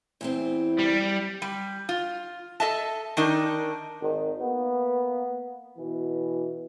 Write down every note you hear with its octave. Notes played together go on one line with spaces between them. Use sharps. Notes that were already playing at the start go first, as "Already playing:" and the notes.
E2 E3 C4
G3
G3
F4
A4 D#5 E5 A5
D#3 D4 D#4 A#4
G#1 D#3
A#3 B3
B2 E3